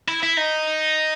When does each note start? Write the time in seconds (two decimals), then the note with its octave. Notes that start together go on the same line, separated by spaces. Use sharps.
0.08 E4
0.23 E4
0.37 D#4